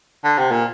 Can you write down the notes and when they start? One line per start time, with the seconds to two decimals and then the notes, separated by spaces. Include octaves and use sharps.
0.24 D3
0.38 C3
0.51 A#2